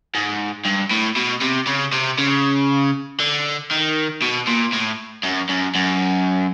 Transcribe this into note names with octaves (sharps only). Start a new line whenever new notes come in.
G#2
G2
A2
B2
C3
C#3
C3
C#3
D3
D#3
B2
A#2
A2
F#2
F#2
F#2